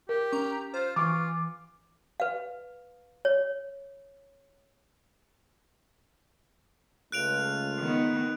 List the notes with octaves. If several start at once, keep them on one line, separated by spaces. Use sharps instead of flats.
G4 A#4
C#4 A#5
F4 C5
E3 F4 C#6 D6
B4 F5
C#5
C#2 A3 F4 F#6 D7 F7
D#3 B3